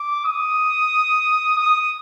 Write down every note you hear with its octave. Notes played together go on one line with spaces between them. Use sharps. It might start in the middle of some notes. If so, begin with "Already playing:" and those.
Already playing: D6
D#6
D#6